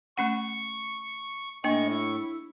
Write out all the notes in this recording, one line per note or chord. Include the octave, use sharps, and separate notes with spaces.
A3 C#4 F#5 C#6
A2 A#3 D4 D#5 G5 C#6
E4